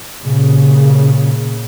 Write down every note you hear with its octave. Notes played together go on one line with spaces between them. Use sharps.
A#2 C#3